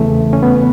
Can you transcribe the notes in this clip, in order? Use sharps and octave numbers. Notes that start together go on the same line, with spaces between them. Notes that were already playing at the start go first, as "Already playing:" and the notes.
Already playing: E2 C#3 E3 A3
C#4
B3